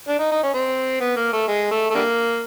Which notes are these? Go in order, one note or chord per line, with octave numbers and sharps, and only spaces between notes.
D4
D#4
D#4
C#4
C4
B3
A#3
A3
G#3
A3
A3
D3 G3 A#3